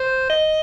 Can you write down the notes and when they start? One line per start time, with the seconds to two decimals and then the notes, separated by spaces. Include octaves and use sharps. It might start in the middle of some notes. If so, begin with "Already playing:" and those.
Already playing: C5
0.30 D#5